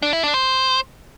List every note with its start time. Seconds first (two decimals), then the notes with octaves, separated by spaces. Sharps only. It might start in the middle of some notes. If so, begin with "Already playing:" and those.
0.02 D4
0.13 E4
0.23 D4
0.34 C5